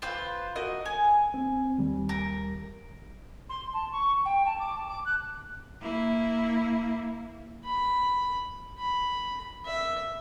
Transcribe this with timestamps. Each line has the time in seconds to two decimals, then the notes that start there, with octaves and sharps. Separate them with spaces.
0.02 F4 B4 C5
0.55 F#4 A#4 D#5
0.85 G#5
1.34 C4
1.78 D#2 G3
2.09 A#4
3.49 C6
3.73 A5
3.91 C#6
4.25 G5
4.45 A5
4.59 D6
4.75 A5
4.87 D6
5.05 F#6
5.81 A#3 E4
7.65 B5
8.78 B5
9.66 E5